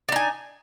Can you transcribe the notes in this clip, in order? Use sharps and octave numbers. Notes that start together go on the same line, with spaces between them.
D4 D#4 G#5